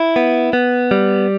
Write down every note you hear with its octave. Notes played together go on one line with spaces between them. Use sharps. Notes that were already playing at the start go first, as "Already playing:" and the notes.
Already playing: E4
B3
B3
G3